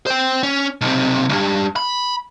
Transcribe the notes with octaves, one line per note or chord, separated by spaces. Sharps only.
C5 G5
C#4
B1 C3
C2 G2
B5